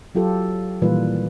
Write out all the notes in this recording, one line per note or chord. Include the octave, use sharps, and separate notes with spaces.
F#3 F4 G4 A4
A#2 D#3 E3 G3 F4 B4